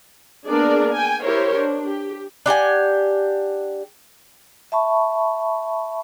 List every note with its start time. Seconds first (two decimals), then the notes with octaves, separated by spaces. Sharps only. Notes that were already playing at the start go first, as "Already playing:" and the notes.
0.47 A#3 B3 D4 G#4 A#4 D5
0.93 G5 G#5
1.23 E4 G4 A#4 C5 C#5
1.54 D4
1.86 G4
2.46 D4 G4 F#5 G#5
4.72 E5 A5 B5 C#6